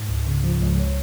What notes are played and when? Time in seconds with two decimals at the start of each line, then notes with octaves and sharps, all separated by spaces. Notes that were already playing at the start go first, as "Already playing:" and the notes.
Already playing: G#2
0.09 C#2
0.27 C#3
0.44 F3
0.61 C#2
0.80 C#5